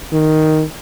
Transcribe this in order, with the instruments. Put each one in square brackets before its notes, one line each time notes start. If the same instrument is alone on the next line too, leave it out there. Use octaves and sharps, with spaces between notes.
[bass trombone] D#3